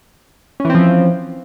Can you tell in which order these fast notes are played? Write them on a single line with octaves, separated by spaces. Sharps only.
C#4 E3 C4 F3